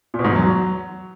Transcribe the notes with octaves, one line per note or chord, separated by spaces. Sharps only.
A#2
B2
G#2
E2
F#3